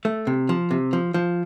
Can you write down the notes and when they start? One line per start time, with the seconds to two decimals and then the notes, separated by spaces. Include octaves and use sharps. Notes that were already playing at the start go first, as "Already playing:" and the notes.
0.05 A3
0.27 C3
0.49 F3
0.71 C3
0.93 F3
1.14 F3